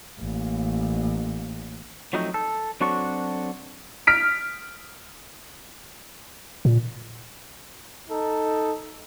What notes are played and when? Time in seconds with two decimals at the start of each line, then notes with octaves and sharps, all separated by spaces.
0.20 A1 A#3
2.13 F3 F#3 A3 C4 D#4
2.34 A4
2.81 F#3 C4 D4 F#4 A4 C#5
4.07 F6 B6 D7
6.65 A#2
8.10 D#4 A4